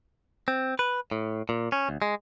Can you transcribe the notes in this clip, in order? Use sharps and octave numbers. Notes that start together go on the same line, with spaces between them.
C4
B4
A2
A#2
C#4
D2
G#3